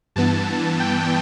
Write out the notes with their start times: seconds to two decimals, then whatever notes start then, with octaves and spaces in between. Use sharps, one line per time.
0.16 G2 E3 B3 A5
0.80 G5